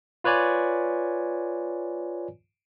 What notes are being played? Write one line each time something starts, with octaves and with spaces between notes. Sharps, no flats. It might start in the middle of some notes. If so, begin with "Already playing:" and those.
F4 B4 C#5 D5 G#5